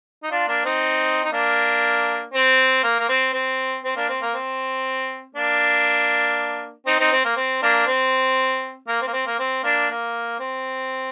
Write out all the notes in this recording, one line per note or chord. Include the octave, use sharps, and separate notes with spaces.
D#4
D4 F4
A#3 D4
C4 D#4
D#4
A#3 D4
C4
A#3
A#3
C4
C4
C4
A#3 D4
C4
A#3
C4
A#3 D4
C4 D#4
C4 D#4
C4
A#3
C4
A#3 D4
C4
A#3
C4
A#3
C4
A#3
C4
A#3 D4
A#3
C4